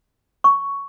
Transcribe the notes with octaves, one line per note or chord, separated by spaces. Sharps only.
C#6